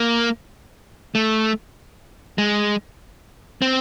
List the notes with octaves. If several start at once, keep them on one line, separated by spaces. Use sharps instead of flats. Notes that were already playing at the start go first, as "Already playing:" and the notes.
Already playing: A#3
A3
G#3
C4